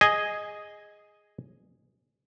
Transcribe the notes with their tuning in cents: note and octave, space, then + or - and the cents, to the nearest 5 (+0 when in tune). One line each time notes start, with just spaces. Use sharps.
G#4 +0 D#5 +0 G#5 +0